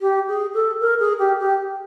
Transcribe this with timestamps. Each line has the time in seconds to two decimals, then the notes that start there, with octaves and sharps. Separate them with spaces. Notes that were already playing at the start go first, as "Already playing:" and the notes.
0.01 G4
0.28 G#4
0.54 A4
0.80 A#4
0.99 G#4
1.18 G4
1.39 G4